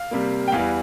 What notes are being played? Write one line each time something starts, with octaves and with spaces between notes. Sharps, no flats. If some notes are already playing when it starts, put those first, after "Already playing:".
Already playing: F5
C3 G3 A#3
G5
E2 E3 G3 F5